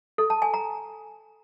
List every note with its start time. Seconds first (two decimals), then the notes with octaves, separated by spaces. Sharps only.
0.18 A4
0.30 A5
0.42 G#5
0.54 A#5